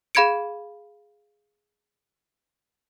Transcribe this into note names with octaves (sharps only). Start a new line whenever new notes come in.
G#4 F5 B5 G#6 C#7 D7